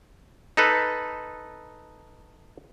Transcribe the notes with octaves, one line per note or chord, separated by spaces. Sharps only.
D#4 A4 B4